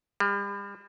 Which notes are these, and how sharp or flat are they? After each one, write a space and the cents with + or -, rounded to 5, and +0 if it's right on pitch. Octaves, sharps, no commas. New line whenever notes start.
G3 +40